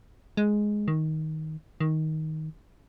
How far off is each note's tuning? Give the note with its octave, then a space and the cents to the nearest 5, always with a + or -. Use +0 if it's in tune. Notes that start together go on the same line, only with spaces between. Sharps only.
G#3 +5
D#3 +10
D#3 +10